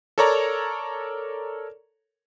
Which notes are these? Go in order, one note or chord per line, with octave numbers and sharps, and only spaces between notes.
A4 A#4 C#5 D5 A#5